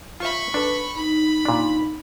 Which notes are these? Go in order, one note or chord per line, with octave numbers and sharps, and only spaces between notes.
F4 C5 E5 B5 C#6
D4 A4 B4
D#4 B5
A#2 D4